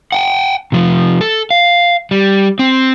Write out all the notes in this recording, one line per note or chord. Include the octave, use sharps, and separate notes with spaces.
F#5 G5
C3 F3
A4
F5
G3
C4